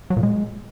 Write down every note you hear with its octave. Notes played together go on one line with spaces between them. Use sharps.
F#3
A#2
G#3